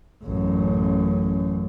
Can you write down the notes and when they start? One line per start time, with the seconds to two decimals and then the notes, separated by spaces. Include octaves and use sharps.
0.23 A1 F#2